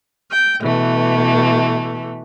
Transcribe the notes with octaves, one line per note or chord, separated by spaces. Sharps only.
G5
B2 E3 A3